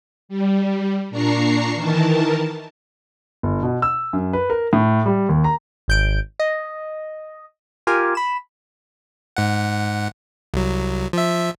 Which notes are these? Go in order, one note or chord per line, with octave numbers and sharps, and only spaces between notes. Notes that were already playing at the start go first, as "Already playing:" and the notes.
G3
A#2 D4 A#5 C#6 C7
D#3 E3 A#4 A5
G1
B2
E6
F#2
B4
A#4
A2
G3
D#2
A#5
G#1 G6 D7
D#5
F4 G4 A#4 G#5
B5 E7
G#2 F#5
C2 F#3
F3 E5